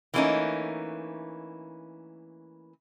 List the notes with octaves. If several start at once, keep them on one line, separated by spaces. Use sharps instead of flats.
E3 A3 A#3 C4 C#4 D#4